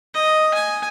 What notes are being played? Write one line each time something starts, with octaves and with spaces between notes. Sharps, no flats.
D#5
G#5